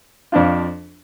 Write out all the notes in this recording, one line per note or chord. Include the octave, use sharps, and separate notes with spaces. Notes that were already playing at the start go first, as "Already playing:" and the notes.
F2 F3 D4 F4